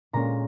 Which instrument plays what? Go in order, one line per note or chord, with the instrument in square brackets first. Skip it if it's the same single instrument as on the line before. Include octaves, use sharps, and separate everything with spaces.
[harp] A#2 G#3 C#4 A#5